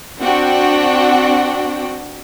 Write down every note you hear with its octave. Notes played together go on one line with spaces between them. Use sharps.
C4 D4 F#4 F#5 G5